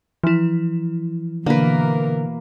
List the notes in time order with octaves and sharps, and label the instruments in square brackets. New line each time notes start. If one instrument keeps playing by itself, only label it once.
[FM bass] E3 [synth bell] F3 E4
[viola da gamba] B2 E3 A#4 [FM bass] D3 [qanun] A#3 B4